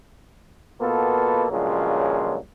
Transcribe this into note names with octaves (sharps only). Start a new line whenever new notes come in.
B2 A#3 B3 F4 A4
G2 A#2 C#3 F3 F#3 G#3